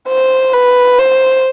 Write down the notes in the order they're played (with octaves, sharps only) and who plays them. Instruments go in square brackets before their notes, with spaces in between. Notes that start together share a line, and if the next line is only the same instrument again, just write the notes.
[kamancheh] C5
B4
C5